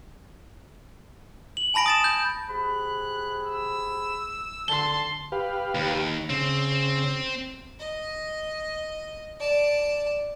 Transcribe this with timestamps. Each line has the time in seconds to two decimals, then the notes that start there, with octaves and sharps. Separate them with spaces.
1.57 F#7
1.74 G#5 A5 B5 A#6 D7
1.86 D#6 A6 E7
2.04 G6
2.48 C3 G#4 B5 F#6
3.45 E6
4.68 D3 A5 C6 G7
5.32 G4 B4 F5
5.75 D#2
6.30 C#3 C4
7.79 D#5
9.39 D5 A5